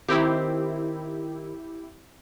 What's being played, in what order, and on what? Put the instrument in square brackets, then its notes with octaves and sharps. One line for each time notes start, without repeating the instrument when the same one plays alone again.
[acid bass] D#3 [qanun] C4 [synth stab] E4 G4